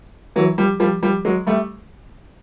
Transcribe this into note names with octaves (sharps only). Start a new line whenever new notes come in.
E3 F#3
F3 G3
F3 G3
F3 G3
F#3 G#3
G3 A3